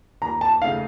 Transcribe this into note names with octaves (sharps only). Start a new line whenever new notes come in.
D#2 A#5
A5
C#3 A3 D#4 F5